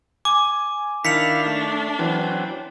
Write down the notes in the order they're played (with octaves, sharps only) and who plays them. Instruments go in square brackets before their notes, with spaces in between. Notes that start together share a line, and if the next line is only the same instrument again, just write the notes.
[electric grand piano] G#5 [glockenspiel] D6
[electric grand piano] D#3 [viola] D4 [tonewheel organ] E4 F5 [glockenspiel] B6 C#7 F7
[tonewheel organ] A3
[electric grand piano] E3 [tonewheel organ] F#3 C4